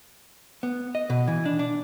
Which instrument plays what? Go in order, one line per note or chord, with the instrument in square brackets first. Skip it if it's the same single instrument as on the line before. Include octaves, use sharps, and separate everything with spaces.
[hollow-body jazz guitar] B3
D#5
B2
E3
D4
D4